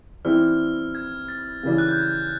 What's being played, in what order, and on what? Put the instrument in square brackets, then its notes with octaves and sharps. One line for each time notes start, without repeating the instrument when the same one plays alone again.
[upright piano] E3 G3 C4 E4 G4 [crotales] F6
[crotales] G#6
A6
[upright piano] C#3 E3 G3
[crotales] F#6
G6
G#6